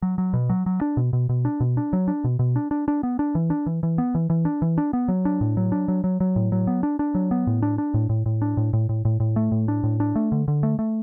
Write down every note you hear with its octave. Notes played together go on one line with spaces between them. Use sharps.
F#3
F#3
B2
F#3
F#3
D4
B2
B2
B2
D4
B2
D4
F#3
D4
B2
B2
D4
D4
D4
B3
D4
E3
D4
E3
E3
B3
E3
E3
D4
E3
D4
B3
F#3
D4
A2
F#3
D4
F#3
F#3
F#3
A2
F#3
B3
D4
D4
F#3
B3
A2
D4
D4
A2
A2
A2
D4
A2
A2
A2
A2
A2
A3
A2
D4
A2
D4
A3
D3
D3
A3
A3